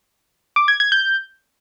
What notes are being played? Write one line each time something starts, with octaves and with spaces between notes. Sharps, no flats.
D6
G#6
G#6
G6